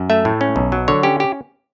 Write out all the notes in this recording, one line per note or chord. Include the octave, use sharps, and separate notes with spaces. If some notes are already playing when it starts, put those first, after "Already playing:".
Already playing: F#2
A3 E5
A2
C#4
B1
F#3
D3 C#5
C#4 G4
G4